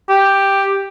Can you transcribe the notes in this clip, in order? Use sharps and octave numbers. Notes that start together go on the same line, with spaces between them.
G4